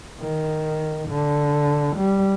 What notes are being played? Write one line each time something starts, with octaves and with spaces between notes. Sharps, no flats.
D#3
D3
G3